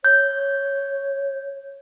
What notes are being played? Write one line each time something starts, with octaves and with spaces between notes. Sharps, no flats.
C#5 G6